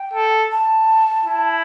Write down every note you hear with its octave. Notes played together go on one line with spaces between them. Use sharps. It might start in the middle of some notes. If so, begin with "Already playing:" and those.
Already playing: G5
A4
A5
E4